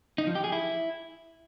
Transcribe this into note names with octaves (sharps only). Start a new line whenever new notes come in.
D#4
F3
G4
G#4
E4